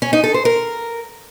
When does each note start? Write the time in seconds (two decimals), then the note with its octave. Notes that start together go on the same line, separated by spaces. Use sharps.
0.02 C#4
0.13 D#4
0.24 A4
0.34 C5
0.45 A#4